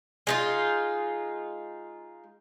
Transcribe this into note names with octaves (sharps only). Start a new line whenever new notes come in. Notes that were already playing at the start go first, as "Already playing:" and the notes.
G#3 D#4 F4